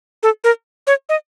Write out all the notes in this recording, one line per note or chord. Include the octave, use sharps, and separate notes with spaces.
A4
A#4
C#5
D#5